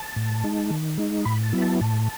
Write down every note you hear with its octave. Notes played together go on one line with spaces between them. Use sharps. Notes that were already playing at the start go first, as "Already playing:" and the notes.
Already playing: A5
A2
G#3 D#4
D#3
G#3 D#4
A2 B5
A5
F#3 B3 E4
B5
A5
A2 A5